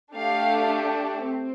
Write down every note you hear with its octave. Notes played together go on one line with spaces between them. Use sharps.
A3 D4 G4 F5
C4